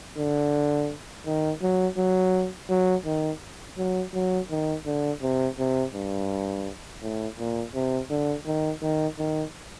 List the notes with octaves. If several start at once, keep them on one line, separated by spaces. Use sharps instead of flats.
D3
D#3
F#3
F#3
F#3
D#3
F#3
F#3
D#3
D3
C3
C3
G2
A2
A#2
C3
D3
D#3
D#3
D#3